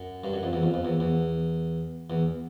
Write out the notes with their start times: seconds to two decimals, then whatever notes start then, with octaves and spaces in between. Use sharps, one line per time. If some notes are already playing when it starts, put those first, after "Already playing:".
Already playing: F#2
0.24 G2
0.33 F#2
0.43 F2
0.53 E2
0.63 F2
0.74 F2
0.85 E2
1.00 E2
2.10 E2